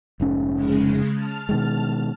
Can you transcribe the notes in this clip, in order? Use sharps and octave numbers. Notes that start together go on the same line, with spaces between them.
F1 G#2 C#4
C#3 G#3
A5 F6
B2 D#3 G#3